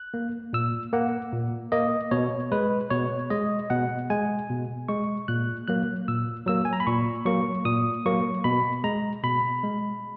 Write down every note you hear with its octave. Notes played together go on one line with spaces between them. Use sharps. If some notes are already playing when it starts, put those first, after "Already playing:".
Already playing: F#6
A#3
A#2 E6
A#3 F#5
A#2
A#3 D#5
B2 C#5
G#3 B4
B2 C#5
G#3 D#5
B2 F#5
G#3 G#5
B2
G#3 C#6
A#2 F#6
F#3 A#3 F#6
A#2 E6
F#3 A#3 E6
G#5
A#5
B5
A#2 C#6
F#3 A#3 C#6
A#2 D#6
F#3 A#3 C#6
B2 B5
G#3 A#5
B2 B5
G#3